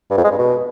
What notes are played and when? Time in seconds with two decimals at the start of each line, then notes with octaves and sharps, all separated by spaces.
0.10 G2
0.17 F2
0.24 G#3
0.31 G2
0.38 B2